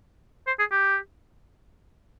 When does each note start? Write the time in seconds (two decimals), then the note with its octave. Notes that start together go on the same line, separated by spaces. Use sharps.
0.47 C5
0.59 G#4
0.71 G4